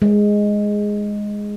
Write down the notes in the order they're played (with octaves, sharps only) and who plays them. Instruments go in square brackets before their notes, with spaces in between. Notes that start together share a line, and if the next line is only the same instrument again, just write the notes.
[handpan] G#3